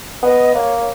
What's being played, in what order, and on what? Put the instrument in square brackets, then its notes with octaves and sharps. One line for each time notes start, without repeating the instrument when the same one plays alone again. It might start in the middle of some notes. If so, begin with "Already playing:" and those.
[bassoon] B3 [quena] D#5
[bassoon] A#3 [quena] C#5